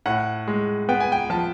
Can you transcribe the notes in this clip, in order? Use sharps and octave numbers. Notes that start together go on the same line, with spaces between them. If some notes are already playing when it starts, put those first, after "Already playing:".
A2 F#5
G#3
B3 G5
G#5
G5
F3 A5